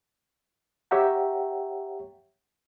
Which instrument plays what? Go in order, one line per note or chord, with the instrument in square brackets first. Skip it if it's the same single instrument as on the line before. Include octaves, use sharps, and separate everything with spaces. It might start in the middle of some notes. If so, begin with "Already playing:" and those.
[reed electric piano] G4 C#5 E5 F#5 G5 A#5